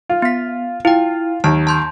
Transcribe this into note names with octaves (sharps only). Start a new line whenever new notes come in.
F4
B3 B6
E4 F4 G5
D#2 A5
A5 C6 G6